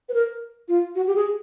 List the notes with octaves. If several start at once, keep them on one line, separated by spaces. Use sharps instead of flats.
B4
A#4
F4
F#4
G4
G#4